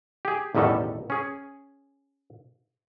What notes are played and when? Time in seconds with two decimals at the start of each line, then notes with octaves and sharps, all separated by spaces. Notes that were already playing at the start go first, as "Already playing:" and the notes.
0.25 G4 G#4
0.55 A1 E2 B2 D#3 G3 A4
1.10 C#4 G#4